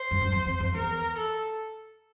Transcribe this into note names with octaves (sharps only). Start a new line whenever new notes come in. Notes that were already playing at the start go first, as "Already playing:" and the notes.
Already playing: C5
F#2
F#2
F2
F2
F2
E2 A#4
A4